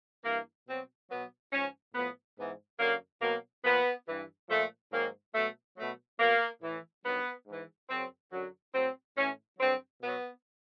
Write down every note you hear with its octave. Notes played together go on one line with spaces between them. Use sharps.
G2 E3 A#3
B2 F#3 C4
B2 F#3 B3
G#2 F3 C#4
A2 F3 B3
G#2 E3 B3
F#2 D3 F#3 A#3
B2 F#3 A#3
A#2 F3 B3
G2 E3
A#2 F3 A3
G#2 D#3 F#3 A#3
B2 F#3 A3
B2 F#3 A3
B2 F#3 A#3
A2 E3
G2 D#3 F#3 B3
G#2 E3
F#2 C#3 F#3 C4
F#2 D3 F#3
A2 F#3 C4
A2 E3 C#4
G2 D3 F#3 C4
B2 F#3 B3